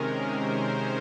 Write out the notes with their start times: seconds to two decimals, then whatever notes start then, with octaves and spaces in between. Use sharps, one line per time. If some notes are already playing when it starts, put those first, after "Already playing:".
Already playing: C3 D#3 G#3 C#4 A#4
0.22 C5